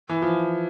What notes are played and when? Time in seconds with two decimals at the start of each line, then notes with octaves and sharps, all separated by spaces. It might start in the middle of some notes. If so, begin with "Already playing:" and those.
0.09 E3
0.22 F3